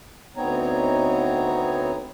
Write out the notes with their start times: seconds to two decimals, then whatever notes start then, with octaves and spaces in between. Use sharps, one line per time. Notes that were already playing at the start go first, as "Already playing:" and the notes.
0.37 D2 B3 C4 D#4 C#5 A#5